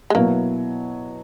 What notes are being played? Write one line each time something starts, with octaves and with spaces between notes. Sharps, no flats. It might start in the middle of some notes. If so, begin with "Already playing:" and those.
G#3
B2 F#3 A#3 B3 E4